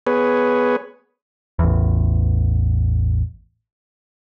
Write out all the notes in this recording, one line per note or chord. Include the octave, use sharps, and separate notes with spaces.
B3 G#4 B4 C#5
A1 E2